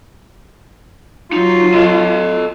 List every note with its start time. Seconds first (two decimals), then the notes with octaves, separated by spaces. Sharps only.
1.33 F#3 D#4 F4
1.74 A4 D#5